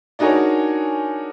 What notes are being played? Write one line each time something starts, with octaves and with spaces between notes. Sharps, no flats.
D4 D#4 F#4 G#4 A#4 C#5